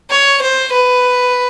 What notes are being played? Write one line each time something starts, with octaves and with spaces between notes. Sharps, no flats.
C#5
C5
B4